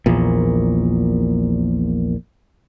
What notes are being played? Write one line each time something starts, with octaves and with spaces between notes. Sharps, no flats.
A#1 E2 A#2